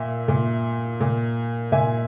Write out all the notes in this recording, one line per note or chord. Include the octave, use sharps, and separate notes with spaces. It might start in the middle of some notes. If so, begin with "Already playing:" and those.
Already playing: A#2 E5
A#2
A#2
A#2 E5 G#5